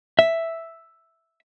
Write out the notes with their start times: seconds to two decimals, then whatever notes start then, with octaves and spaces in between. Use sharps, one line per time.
0.19 E5